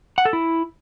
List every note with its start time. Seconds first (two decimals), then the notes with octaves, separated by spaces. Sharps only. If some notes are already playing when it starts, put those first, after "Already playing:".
0.18 F#5
0.25 A4
0.33 E4